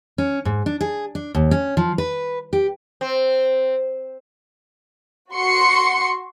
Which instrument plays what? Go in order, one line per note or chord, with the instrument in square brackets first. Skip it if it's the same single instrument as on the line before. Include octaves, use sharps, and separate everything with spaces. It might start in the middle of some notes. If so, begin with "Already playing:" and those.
[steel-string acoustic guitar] C#4
G#2
D4
G#4
D4
D#2
C#4
F3
B4
G4
[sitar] C4
[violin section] F#4 C6 C#6 C#7